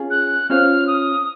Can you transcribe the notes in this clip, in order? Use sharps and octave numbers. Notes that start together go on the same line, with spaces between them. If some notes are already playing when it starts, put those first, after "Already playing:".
Already playing: C#4 F4 G#4
F#6
C#4 F4 C5 F5 F6
D#6